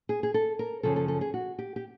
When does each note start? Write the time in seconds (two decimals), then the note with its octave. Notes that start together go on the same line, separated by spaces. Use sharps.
0.09 G#4
0.23 G#4
0.34 A4
0.59 A#4
0.83 F#2 C#3 F3 A4
0.96 A4
1.08 A4
1.21 G#4
1.34 F#4
1.59 G4
1.76 G4